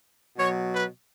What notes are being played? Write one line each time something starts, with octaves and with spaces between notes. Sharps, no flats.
B2 F#3 C#5
B4